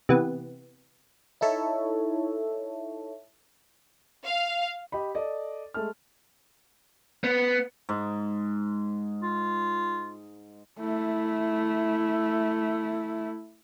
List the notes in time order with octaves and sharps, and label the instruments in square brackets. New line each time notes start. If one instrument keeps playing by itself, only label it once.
[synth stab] C3 E3 B3
[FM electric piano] D#4 E4 A4 C#5 E5
[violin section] F5
[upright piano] G4 D#5 B5
A4 D5 D#5
G#3 A3 A5 F6
[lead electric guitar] B3
[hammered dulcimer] G#2
[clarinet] F4
[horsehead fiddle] A3 E4